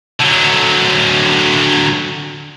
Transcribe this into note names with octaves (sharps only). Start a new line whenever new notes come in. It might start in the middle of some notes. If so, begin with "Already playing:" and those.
D3 F#3